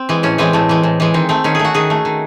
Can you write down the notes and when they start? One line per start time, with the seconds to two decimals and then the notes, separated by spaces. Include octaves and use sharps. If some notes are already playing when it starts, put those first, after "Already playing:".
Already playing: C4
0.09 E3 G#3
0.23 A2 C#4
0.38 E3 G#3 C4
0.53 A2 A3
0.69 E3 G#3
0.83 A2
1.00 E3 G#3
1.14 D#3 C4
1.29 A3 C4
1.44 D#3 C#4
1.55 A3 G#4
1.65 F#4
1.74 D#3 G#4
1.90 A3
2.05 D#3